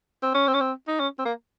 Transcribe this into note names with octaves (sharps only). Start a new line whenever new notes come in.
C4
C#4
C4
C#4
C4
D#4
C#4
C4
A#3